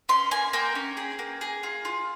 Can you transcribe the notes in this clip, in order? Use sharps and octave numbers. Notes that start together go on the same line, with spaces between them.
C#4 C6
A#3 G#5
A#3 G5
C#4
G#4
A#3
G#4
F4
F4